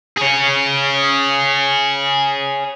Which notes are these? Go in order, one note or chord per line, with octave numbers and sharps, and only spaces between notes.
G#4 C#5